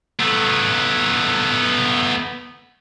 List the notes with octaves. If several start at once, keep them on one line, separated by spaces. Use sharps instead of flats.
A3 B3